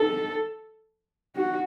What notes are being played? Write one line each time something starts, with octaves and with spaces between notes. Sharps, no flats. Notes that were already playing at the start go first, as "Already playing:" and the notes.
Already playing: A4
F#4